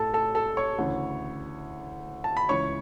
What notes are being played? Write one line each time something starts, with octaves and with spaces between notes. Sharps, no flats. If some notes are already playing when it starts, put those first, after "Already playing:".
Already playing: A1 A2 A3 A4 A5
A4 A5
A4 A5
C#5 C#6
D2 C#3 E3
A5
B5
C#2 C#3 E3 C#5 C#6